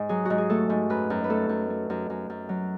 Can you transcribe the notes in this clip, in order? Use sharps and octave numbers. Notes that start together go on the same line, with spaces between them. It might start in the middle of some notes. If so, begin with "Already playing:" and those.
Already playing: G#2
F#3 G#4
G#2 F#4
G#4
A3 A4
G#2
F#2 B4
F#2
B4
A3 A4
F#2
A3
F#2
F#2
F#2
F#3